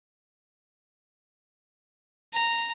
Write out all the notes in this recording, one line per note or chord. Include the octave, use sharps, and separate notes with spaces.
A#5